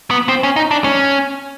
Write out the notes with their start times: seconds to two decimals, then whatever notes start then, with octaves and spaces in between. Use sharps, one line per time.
0.11 B3
0.29 C4
0.43 C#4
0.56 D#4
0.71 D4
0.84 C#4